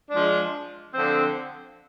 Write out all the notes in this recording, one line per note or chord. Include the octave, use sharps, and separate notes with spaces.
F3 G#3 D4
D3 F3 C4